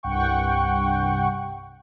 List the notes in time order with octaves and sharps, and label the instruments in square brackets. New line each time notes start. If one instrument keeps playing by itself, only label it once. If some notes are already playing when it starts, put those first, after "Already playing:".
[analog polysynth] C2 G2 F#5 G5 C#6